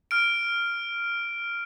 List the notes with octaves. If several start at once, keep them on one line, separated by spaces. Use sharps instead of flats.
F6 D7